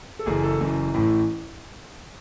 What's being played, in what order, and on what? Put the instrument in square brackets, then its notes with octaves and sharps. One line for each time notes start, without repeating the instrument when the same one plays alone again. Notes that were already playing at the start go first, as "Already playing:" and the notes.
[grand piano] A4
F#1 F#2 E3 G#4
A4
F#1 F#2 E3
A1 A2 E3